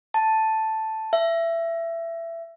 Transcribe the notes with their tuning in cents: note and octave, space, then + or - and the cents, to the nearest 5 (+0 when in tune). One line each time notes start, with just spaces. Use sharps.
A5 +0
E5 +20